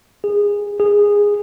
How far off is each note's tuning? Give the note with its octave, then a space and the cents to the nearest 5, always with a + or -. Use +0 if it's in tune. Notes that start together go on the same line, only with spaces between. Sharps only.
G#4 -20
G#4 -15